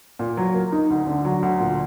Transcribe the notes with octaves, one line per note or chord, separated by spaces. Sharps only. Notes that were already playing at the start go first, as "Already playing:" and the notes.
A#2
F#3
A#3
D#4
D2
D3
F#3
D2
A#2